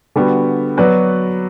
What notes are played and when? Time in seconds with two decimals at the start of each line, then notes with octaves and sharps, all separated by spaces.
0.16 D3 G3 B3 F#4
0.77 F#3 B3 F#4 B4 D5